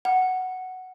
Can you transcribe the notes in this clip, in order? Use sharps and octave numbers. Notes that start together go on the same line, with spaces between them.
F#5